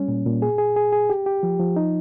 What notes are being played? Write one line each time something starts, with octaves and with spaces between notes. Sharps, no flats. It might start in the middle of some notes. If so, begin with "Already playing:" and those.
Already playing: G3 C#4
A#2
A#2
G#4
G#4
G#4
G#4
G4
G4
F3
F3
D#4